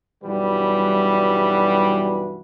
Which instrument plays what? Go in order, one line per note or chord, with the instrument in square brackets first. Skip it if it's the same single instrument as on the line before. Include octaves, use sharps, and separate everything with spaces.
[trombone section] B1 G2 E3 G3 F#4 B4